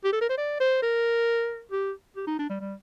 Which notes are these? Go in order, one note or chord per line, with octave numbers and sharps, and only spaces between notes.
G4
A4
A#4
C5
D5
C5
A#4
G4
G4
D#4
D4
G3
G3